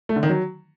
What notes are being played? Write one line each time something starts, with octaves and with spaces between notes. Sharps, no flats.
A3
D3
D#3
F#3